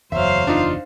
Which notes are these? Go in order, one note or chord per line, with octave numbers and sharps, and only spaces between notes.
F#1 E2 F#3 C5 E5 F5
D4 D#4 F4